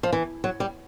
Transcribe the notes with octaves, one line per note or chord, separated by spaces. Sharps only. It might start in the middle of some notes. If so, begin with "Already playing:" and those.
F3
E3
F#3
G3